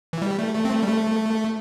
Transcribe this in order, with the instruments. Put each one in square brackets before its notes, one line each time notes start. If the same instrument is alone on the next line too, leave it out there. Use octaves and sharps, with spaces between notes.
[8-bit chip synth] E3
G3
A3
A3
C4
A3
G3
A3